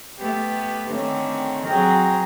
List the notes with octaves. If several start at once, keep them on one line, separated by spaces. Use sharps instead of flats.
A3 B3 G4
D3 D#3 A3 C4 C#4
F#3 C4 G#4 G5 A#5